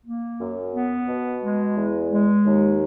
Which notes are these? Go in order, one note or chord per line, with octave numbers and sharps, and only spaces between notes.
A#3
F#2
B3
B2
G#3
E2
G#3
D#2